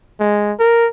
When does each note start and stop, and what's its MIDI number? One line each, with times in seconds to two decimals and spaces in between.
0.20 0.53 56
0.60 0.88 70